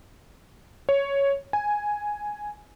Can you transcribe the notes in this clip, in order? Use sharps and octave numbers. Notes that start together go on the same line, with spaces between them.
C#5
G#5